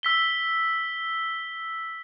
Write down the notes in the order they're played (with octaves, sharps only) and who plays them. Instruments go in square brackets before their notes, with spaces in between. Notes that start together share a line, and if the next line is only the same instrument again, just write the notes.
[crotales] E6 B6 G7